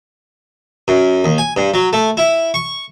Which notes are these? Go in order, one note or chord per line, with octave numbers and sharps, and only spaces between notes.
F#2
D#2
G#5
G2
F#3
A3
E4
C#6